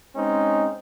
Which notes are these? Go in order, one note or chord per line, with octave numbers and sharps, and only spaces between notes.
G#3 C4 C#4 D#4